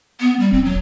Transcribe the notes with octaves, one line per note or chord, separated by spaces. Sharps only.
B3
G3
E1 C4
F#3